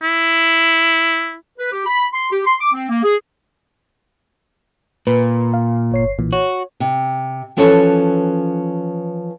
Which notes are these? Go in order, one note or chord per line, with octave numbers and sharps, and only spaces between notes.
E4
B4
G4
B5
C6
G4
C6
D6
C4
A#3
G#4
A#2 B4
F5
G1 C#5 C7
B1 A#2 E3
F#4 C#5
C3
E3 F3 C#4 A4 B4 C#5